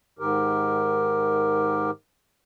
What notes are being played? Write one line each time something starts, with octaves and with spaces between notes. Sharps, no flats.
G#2 D#3 G4 A#4